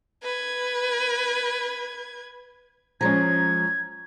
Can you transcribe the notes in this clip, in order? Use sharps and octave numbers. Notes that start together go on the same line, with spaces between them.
B4 G#6
F3 G#3 C#4 A#5 G#6